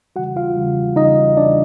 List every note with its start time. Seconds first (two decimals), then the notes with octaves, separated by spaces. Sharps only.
0.16 C#3 E3 G3 F#4 F#5
0.36 F4 F5
0.56 C#3 E3 G3
0.96 C#3 E3 G3 D#4 D#5
1.37 C#3 E3 G3 D4 D5